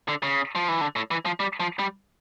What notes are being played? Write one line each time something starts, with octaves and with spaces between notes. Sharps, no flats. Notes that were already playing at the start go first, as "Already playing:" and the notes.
D3
C#3
F3
E3
D3
A2
E3
F3
G3
F3
G3